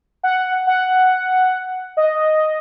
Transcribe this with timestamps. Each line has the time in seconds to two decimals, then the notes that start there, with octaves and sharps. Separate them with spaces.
0.23 F#5
0.67 F#5
1.97 D#5